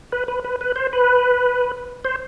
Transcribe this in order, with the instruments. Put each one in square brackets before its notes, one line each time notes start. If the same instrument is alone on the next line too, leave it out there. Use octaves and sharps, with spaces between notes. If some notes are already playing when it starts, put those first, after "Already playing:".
[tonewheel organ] B4
B4
B4
B4
C5
B4
C5